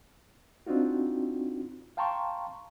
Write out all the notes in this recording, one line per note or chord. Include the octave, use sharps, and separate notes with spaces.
C4 D4 D#4 F4 F#4
F5 G5 A5 A#5 C6 C#6